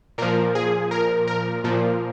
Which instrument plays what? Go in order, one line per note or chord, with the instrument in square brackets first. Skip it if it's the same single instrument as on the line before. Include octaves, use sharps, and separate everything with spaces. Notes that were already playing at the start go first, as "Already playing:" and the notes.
[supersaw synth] A#2 F3 A#4
G#4
A#4
A#4
A#2 F3